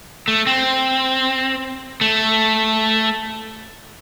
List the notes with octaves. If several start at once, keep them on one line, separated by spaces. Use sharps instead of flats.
A3
C4
A3